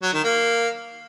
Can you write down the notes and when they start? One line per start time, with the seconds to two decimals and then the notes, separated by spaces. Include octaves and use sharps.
0.03 F#3
0.13 D#3
0.24 A#3